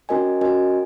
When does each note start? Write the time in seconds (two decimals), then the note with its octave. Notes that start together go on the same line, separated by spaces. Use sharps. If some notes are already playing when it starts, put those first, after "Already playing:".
0.09 C#4 F#4 A#4 D#5 G#5
0.41 C#4 F#4 A#4 D#5 G#5